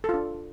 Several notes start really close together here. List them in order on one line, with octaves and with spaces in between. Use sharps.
A4 F4 D4